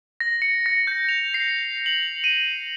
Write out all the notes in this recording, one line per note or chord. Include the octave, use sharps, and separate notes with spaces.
A#6
C#7
A#6
G6
F7
C7
F#7
D#7